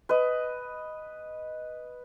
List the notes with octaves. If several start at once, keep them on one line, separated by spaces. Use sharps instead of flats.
B4 D#5